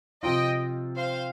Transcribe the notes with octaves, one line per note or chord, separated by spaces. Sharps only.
C3 F3 C4 F4 D#5 G5
C5 F5